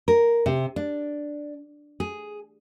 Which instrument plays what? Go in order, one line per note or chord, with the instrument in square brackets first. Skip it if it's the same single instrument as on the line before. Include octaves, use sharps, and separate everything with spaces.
[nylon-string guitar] A#4
C3
D4
G#4